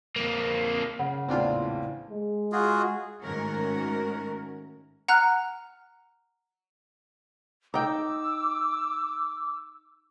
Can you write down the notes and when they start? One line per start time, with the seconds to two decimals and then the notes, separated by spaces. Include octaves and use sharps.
0.16 F2 A#3
0.99 C#3 F#5
1.28 A#1 E2 A2 C4 D4 F4
2.09 G#3
2.52 F4 F#4 G#4
3.23 G#2 D#3 A3 C#4 F#4 A#4
5.08 F#5 A#5 F6 F#6
7.74 D#4 G5 D6 E6